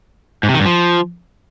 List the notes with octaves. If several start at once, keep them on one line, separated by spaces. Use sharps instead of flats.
G#2
C3
D#3
G2
F3